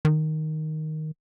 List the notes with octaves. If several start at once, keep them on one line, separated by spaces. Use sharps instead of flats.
D#3